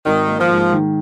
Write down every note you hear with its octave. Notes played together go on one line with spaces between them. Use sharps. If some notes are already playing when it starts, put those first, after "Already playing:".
G#1 D#3
A#3
F3
G#2
D#3